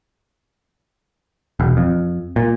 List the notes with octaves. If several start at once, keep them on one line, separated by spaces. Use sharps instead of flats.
E1
F2
A#2